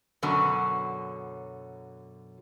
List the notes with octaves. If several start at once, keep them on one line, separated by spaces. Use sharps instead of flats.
F#2 B2 D3 F#3